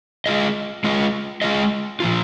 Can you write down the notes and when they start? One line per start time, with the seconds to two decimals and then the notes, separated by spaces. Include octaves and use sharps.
0.26 G#3 F4 G#4 D#5
0.84 G#3 F4 G#4 D#5
1.42 G#3 F4 G#4 D#5
2.00 A#2 F3 G#3 F4